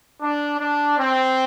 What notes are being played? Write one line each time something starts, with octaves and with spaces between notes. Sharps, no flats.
D4
D4
C4